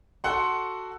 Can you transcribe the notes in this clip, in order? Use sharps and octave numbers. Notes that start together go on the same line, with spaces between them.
F#4 A4 F#5 C6